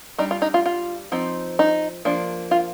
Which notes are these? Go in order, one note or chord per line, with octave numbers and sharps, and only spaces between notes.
G3 D4 D#4
F4
D#4
F4
F4
F3 C4 D#4
D#4
F3 A#3 D4
F4